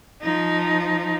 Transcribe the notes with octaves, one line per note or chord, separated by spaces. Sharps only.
F3 D#4